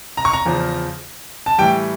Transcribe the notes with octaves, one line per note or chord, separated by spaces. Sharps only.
A#5
C#6
A#5
E2 C#3 F3
A5
A2 E3 G3 G5